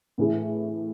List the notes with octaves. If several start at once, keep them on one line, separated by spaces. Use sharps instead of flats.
A2 E3 A3 E4 G#4